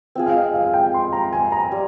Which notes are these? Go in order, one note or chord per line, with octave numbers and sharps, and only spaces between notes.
C4 F4 G#4
F5
D#5
F5
F5
G5
C6
A#5
G#5
A#5
G3